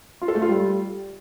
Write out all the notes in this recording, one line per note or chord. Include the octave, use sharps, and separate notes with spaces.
F4
A4
A3
F4
G3